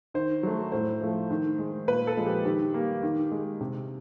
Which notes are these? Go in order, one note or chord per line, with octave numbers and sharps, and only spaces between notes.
D#3 C5
F#3 A3
A2 C5
F3 A3
D#3
G#3
A#2 B4
A4
F3 G#3
G4
D#3 G4
G3 A#3
D#3
G#3
C3